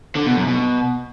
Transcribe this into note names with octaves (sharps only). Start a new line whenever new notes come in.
D3
B2
F#2
B2